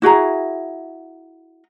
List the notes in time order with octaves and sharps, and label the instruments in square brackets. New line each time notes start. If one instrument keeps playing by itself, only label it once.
[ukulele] E4 F#4 G#4 A#5